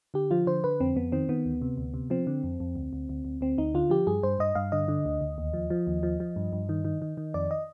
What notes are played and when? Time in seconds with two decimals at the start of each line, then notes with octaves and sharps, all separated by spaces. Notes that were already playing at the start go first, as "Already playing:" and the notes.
0.14 D3 G4
0.31 F3 F4
0.47 D3 C5
0.64 D3 B4
0.80 F2 C4
0.96 F2 B3
1.12 D#3 C4
1.29 D#3 B3
1.45 D2
1.62 C3
1.78 D2
1.94 C3
2.10 F3 C4
2.27 D3
2.44 F2
2.60 F2
2.75 D2
2.93 D2
3.09 D2
3.25 D2
3.41 D2 C4
3.58 D2 D#4
3.74 D3 F4
3.90 F3 G4
4.07 G2 G#4
4.23 G2 C5
4.39 G2 D#5
4.55 G2 F5
4.72 D3 D#5
4.88 D3
5.06 D2
5.21 D2
5.38 D#2
5.53 F3
5.70 F3
5.87 D#2
6.03 F3
6.20 F3
6.36 G2
6.53 G2
6.69 D#3
6.85 D#3
7.02 D#3
7.17 D#3
7.34 F2 D5
7.51 D#5